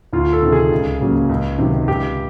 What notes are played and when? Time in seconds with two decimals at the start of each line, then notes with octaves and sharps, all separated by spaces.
0.13 D2 F4
0.33 A4
0.42 C3 D#3
0.52 G#4
0.72 C#2
1.01 C#3 F#3 A#3
1.29 C#2
1.58 C3 D#3 F#3
1.88 C#2 G4